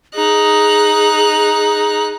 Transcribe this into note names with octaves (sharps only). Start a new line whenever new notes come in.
D#4 G#4 F#6